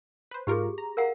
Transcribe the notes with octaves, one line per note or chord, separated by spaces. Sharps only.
B4 C5
G#2 F4 G4 G#4 A#4
A#5
A#4 F5 F#5